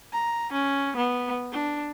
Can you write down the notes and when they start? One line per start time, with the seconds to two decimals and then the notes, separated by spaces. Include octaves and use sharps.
0.13 A#5
0.53 C#4
0.97 B3
1.52 D4